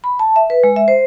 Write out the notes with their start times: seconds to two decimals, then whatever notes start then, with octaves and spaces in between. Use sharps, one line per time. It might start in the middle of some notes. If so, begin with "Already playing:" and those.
0.04 B5
0.19 A5
0.36 E5
0.50 B4
0.63 G#3
0.76 E5
0.88 C5